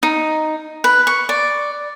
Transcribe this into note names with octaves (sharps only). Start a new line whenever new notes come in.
D#4
B4
C#6
D5